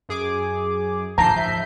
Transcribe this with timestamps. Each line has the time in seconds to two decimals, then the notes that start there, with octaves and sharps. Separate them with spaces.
0.09 F#2 G#4 D6
1.18 D1 A#1 G#2 F3 A5 A#5 G6 C7
1.35 F3 E5